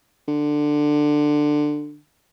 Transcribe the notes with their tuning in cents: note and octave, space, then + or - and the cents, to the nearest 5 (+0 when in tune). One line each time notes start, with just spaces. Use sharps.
D3 +15